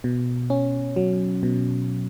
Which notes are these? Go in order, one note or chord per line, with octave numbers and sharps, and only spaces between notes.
B2
C#4
F#3
B2